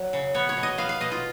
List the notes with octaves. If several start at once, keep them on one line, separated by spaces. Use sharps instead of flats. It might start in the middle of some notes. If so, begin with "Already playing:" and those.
Already playing: F#3
C#3
B3 C#5
C#5
B2
D#5
B3 F5
F5
B2 D#5
F4